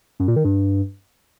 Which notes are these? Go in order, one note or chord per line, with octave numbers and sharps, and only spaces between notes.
F#2
A#2
D#3
G2